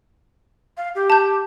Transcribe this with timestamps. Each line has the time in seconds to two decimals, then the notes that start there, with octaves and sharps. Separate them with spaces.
0.77 F5
0.95 G4
1.10 A5 G6